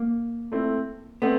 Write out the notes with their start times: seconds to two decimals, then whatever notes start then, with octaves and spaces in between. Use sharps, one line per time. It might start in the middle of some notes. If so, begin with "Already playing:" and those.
Already playing: A#3
0.52 A3 C4 E4
1.22 A3 B3 C4